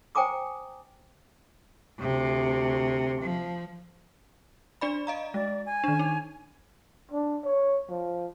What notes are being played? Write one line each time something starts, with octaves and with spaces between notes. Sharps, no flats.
C5 G5 G#5 A#5 D6 D#6
D2 C3
F3
D4 D5 B5
D#5 F5 A#5
G#3 D5
G#5
D#3 D4
D#4
D4
C#5
F3